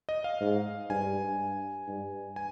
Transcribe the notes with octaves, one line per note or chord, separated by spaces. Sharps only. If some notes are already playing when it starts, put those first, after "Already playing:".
D#5
F5
G#2
G2 G#5
G2
G#5